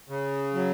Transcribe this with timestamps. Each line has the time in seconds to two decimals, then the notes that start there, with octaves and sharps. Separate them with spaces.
0.09 C#3
0.54 F#3